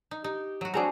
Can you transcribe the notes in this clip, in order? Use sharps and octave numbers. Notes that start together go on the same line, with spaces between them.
D#4
D#4 G4
F#3 F#4
A3 C4 D4 F#4 G#4 D5 A#5